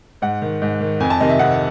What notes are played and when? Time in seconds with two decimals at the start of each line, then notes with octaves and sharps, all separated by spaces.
0.22 G#2 F#5
0.42 D#3
0.62 G#2
0.81 D#3
1.00 F2 G#5
1.10 A5
1.20 C3 D#3 D#5
1.30 E5
1.39 F2 F#5